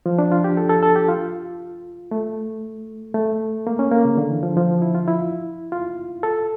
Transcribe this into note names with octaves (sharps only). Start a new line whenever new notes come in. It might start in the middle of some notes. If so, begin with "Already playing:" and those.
F3
D4
F4
G4
A4
A4
A4
G4
F4
A3
A3
A#3
C#4
A#3
C#3
D3
E3
F3
F3
E4
F4
E4
F4
A4